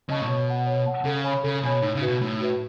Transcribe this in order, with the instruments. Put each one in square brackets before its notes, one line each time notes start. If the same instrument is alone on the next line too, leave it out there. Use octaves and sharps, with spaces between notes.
[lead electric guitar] C#3 [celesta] D#5 A5 C#6
[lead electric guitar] A2
[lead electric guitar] B2 [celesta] C#5
[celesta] F#5 A5
C#5
F#5 A5
[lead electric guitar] C#3 [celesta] A4
[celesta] C#5 G#5 B5
[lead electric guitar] C#3 [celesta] A4
[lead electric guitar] B2 [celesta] C#5 G#5 B5
[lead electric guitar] A2 [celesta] D#4
[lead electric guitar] C#3
[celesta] F#4 B4 E5
[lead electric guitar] B2
[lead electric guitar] A2 [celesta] D#4
[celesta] F#4 B4 E5